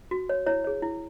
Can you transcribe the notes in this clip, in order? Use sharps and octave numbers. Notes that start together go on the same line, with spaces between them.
F#4
C#5
E4 C#5
G#4 C#5
E4